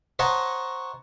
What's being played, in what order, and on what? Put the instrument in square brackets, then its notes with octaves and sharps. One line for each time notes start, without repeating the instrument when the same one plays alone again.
[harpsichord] C5 C#5 D#5 F#5 A5 A#5